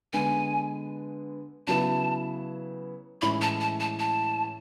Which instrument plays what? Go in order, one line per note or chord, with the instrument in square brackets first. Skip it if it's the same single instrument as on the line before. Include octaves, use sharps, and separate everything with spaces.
[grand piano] D3 G#3 B3 [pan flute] G#5
[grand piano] C#3 F#3 B3 E4 [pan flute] A5
[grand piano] A2 E3 G#3 C#4 E4 [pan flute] B5
[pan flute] A5
A5
A5
A5